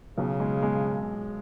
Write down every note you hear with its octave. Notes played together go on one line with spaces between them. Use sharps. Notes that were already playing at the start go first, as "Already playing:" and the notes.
B1 C#3
G#3
G#3